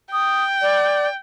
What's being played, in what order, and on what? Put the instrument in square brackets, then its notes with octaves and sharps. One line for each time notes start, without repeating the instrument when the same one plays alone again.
[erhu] G5 [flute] D#6
[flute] D5